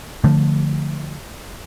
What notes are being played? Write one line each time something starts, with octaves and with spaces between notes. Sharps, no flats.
D3 F3 A3